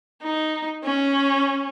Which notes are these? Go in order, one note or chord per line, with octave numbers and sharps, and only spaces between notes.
D#4
C#4